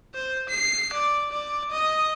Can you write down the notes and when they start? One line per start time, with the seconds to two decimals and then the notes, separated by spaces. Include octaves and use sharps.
0.14 C5
0.49 C7
0.93 D5
1.32 D5
1.71 D#5